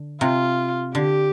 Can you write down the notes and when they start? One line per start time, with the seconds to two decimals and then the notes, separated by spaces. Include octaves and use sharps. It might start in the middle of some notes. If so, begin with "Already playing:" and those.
Already playing: D3
0.21 C3 F4
0.94 D3 G4